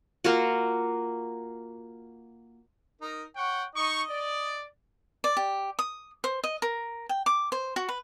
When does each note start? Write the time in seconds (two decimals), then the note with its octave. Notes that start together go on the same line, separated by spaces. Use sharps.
0.24 A#3 F4 F#4
3.01 D#4 A#4
3.36 C#5 F#5 G5 C#6
3.75 D#4 D#5 C#6
4.10 D5
5.24 D5
5.37 G4
5.79 D#6
6.24 C5
6.44 D#5
6.62 A#4
7.09 G5
7.26 D6
7.52 C5
7.76 F#4
7.89 B4